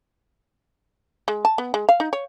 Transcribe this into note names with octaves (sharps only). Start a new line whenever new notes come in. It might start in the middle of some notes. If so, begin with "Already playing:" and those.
G#3
A5
B3
G#3
F5
D#4
C#5